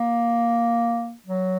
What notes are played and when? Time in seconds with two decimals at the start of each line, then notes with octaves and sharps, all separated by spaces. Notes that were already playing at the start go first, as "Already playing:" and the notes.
Already playing: A#3
1.26 F#3